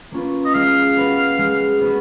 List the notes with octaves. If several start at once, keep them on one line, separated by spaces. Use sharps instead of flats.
A#3 C#4 F4 B4
D#5
G#3 F5
B3 F#4 B4
G#3
B3 F#4 B4